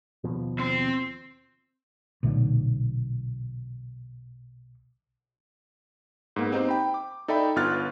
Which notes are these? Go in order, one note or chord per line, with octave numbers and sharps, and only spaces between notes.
D#2 B2 F3
C4 C5
B1 A#2 D3 A3
G#2 A#3 B3
C4 D#4 G4 C5
G5 B5
D6
D#4 A4 D5 E5 G5 B5
G1 B3 F4 F6 F#6 A6